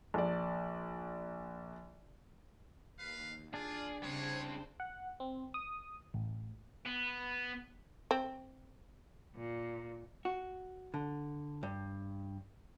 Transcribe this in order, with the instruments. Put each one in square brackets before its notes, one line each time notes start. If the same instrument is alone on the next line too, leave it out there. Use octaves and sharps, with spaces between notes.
[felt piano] A#1 D5
[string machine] D#2 [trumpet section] B4 F5
[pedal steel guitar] D4 [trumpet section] F4 [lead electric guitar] G#4 [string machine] D5
[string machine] C#3 C5 [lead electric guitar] G3 C4 [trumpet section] G#4 C#5
[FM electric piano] F#5
C4
D#6
A1
[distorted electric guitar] B3
[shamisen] C4
[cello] A#2
[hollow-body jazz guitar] F#4
D3
G2